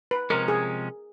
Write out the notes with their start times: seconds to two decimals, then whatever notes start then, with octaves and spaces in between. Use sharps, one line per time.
0.11 B4
0.30 C3 F3 G#3 C#4 A#4
0.48 G#4